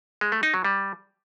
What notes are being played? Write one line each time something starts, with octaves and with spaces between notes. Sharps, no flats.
G#3
A3
D#4
F#3
G3